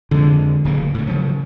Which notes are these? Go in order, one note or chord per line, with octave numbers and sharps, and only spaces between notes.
F2 D3 G#3
D1 C#3 A#3
A2 D3
C#3 F3 F#3